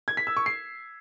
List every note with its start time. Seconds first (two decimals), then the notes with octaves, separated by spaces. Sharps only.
0.08 G#6
0.17 B6
0.27 E6
0.37 C#6
0.46 C7